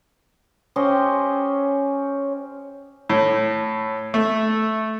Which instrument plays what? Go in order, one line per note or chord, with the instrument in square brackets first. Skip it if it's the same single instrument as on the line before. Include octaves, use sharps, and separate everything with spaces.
[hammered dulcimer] C#4 G4 C5 D#5
[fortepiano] A2
A3